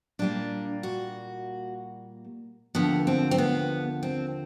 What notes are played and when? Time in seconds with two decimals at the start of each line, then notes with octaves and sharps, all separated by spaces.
0.19 A#2 G3 A#3 D4
0.83 F#4
2.75 D#2 D3 F3 B3
3.07 C4
3.31 C4
3.38 B3
4.03 C4